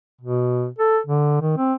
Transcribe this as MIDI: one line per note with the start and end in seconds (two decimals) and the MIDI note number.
0.21 0.67 47
0.78 0.99 69
1.07 1.39 50
1.41 1.57 51
1.58 1.74 60